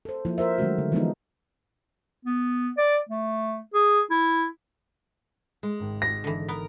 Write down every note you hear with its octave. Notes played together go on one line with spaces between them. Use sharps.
A4 C5
F3 A#3 E4
A#4 C5 E5
D#3 F#3 G#3 A3 C#4 F#4
D3
E3 F3 G#3 B3 D4 D#4
B3
D5
A3
G#4
E4
G#3
G#1 G#2
A#6
D3 E3
B3 A#4